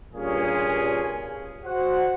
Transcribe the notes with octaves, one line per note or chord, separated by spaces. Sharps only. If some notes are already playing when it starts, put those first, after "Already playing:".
G2 A#2 C#4 G#4
F#4 C5 F#5